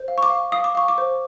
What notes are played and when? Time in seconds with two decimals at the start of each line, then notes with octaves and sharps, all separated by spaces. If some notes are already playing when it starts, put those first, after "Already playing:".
Already playing: C5
0.08 F5
0.18 C#6
0.23 D6
0.30 F5
0.52 F5 D#6
0.64 D6
0.75 F5 C#6
0.88 D6
0.98 C5